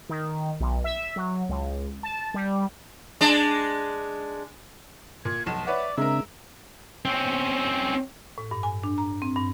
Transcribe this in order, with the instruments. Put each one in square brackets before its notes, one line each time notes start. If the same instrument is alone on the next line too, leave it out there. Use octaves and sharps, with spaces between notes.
[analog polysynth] D#3
B1
E5
F#3
C#2
A5
G3
[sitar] G#3 D4
[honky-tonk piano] A#2 [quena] G#6
[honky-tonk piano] F1 B1 E7 [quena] A5
[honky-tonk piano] B4 C#5 F#5 [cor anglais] D5 [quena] E5
[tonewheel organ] C#3 C4 D4 [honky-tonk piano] G#3 A#4 [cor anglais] E5 [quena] A#5
[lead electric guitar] C4 C#4
[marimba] A2
G2
G#5
D4
A#5
C4
G2